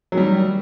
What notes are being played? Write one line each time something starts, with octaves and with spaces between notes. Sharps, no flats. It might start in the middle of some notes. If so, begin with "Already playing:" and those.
D#3 F#3 G3